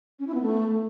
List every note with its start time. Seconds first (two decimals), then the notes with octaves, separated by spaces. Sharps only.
0.19 C#4
0.27 E4
0.34 B3
0.42 A3